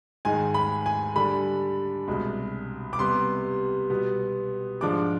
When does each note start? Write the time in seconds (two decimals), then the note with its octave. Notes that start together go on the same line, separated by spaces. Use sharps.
0.25 G#2 D#3 G#3 G#5
0.54 B5
0.86 G#5
1.15 D3 G3 D4 B5
2.08 C2 B2 G#3
2.93 D6
2.99 C3 G3 B3 C6
3.90 B2 G3 B3
4.81 G#2 F3 G#3 D4 D6